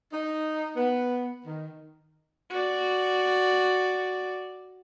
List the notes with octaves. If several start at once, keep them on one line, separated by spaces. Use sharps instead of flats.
D#4
B3
D#3
F#4 D5